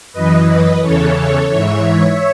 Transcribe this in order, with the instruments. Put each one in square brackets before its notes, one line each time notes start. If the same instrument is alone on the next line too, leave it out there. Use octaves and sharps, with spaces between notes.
[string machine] F#2 E3 B4 D#5
B4 D#5
E2 C#3 E3 A4 C#5
A4 C#5
G#2 E3 C#5 E5